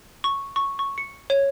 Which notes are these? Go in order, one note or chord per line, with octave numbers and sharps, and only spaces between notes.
C#6
C#6
C#6
C#7
C#5